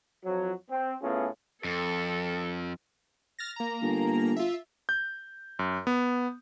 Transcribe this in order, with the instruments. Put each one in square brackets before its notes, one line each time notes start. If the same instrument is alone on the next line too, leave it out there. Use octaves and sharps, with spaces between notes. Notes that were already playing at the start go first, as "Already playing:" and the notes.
[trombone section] F2 F3 F#3
C4
A2 B3 C#4 F4 G#4
[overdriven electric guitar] F2 [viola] A4
[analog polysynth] F6 A6 A#6
A#3 A#5
[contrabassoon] G1
[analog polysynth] F4 E5
[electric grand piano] G6
F#2
B3